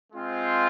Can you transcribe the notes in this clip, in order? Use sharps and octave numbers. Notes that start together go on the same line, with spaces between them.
G#3 C4 F4 C5